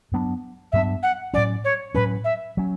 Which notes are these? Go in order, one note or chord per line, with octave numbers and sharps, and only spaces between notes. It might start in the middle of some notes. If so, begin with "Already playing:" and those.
G2 F#3 B3 D4
G2 F#3 B3 D4 E5
F#5
A2 F#3 C#4 D5
C#5
A2 F#3 C#4 B4
E5
F#3 C#4